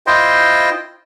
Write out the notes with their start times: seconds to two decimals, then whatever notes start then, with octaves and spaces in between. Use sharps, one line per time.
0.07 E4 F4 C5 D#5 G5 C6